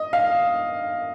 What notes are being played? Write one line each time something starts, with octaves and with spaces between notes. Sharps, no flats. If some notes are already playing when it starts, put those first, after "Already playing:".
Already playing: D#5
F5